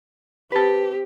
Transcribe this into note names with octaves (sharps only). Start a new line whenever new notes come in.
C4 G4 B4 A5